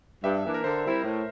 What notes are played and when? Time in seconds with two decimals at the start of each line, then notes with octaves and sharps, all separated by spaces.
0.24 G2 E5
0.44 E3 A#3 D4
0.54 A#4
0.64 D3 C5
0.84 G3 C4 E4
1.03 A2